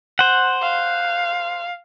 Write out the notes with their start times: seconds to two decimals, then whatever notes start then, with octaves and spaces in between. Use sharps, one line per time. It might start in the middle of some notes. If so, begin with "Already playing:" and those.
0.19 C5 F#5
0.62 F5